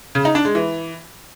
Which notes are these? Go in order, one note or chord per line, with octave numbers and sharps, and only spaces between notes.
C#3
D#4
D4
G#3
E3